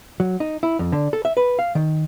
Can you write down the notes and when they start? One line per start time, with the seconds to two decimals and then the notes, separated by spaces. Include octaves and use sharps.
0.20 F#3
0.40 D#4
0.63 E4
0.79 F2
0.92 D3
1.13 A4
1.25 E5
1.37 B4
1.59 F5
1.75 D#3